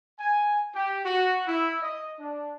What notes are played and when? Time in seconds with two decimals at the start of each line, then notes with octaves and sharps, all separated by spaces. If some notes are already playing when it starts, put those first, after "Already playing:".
0.19 G#5
0.74 G4
1.05 F#4
1.47 E4
1.82 D#5
2.20 D4